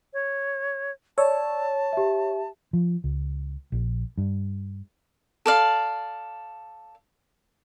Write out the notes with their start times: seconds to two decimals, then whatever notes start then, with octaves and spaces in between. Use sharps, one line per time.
0.13 C#5
1.18 C#5 D5 A5 E6
1.93 G4 E5
2.73 F3
3.04 C#2
3.72 A#1
4.18 G2
5.46 A4 D5 F5